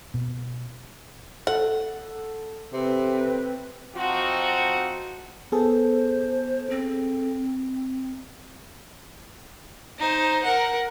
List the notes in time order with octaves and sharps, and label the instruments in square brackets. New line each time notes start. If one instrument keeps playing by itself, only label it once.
[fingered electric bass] B2
[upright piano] A4 [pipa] F#5
[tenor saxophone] C3 [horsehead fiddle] C4 B4
[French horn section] F3 C4 D#4 F4 F#4
[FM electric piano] B3 G#4 A4 [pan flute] C5
[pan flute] C4
[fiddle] D#4 C5
A#4 F#5